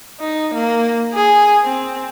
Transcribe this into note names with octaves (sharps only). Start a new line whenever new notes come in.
D#4
A#3
G#4
C4